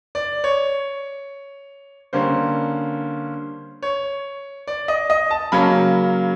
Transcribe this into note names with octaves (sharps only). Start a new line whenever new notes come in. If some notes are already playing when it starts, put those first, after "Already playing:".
D5
C#5
D3 G3 A#3 C#4 C5
C#5
D5
D#5
D#5
A5
C#3 F#3 A#3 C#4 B5